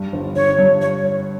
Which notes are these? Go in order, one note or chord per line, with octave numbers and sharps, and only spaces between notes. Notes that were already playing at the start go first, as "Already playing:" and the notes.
Already playing: G2
G1
G1 C#5
G2
C#5